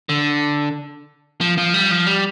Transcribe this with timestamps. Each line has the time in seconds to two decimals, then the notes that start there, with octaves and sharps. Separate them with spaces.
0.09 D3
1.41 F3
1.58 F3
1.74 G3
1.91 F3
2.07 G3